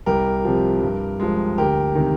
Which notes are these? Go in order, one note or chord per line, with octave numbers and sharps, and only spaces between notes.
C2 G4 A#4
C3 F3
G2
F3 G#3
D2 G4 A#4
C3 D#3